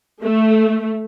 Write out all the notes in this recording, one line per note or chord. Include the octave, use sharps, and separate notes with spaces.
A3